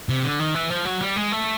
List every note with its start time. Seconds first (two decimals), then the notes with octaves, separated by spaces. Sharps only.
0.09 C3
0.24 D3
0.39 D#3
0.55 E3
0.70 F3
0.85 F#3
1.01 G3
1.16 G#3
1.32 A3